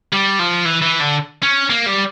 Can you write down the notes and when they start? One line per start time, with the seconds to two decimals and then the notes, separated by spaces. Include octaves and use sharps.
0.12 G3
0.39 F3
0.65 E3
0.82 E3
1.00 D3
1.42 C#4
1.70 A#3
1.86 G3